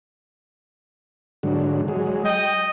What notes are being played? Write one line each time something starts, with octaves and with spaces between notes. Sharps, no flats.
G#2 D3 F#3
F#3 G#3
D#5 G5